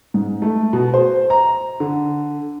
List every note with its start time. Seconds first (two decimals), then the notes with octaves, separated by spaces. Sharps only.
0.14 G#2
0.42 A3
0.73 B2
0.94 C5
1.30 A#5
1.80 D3